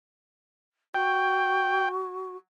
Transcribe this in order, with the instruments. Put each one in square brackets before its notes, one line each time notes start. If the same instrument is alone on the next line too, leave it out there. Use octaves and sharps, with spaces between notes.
[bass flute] F#4 [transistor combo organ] G5